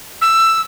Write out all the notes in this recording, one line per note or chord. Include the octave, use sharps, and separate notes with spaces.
E6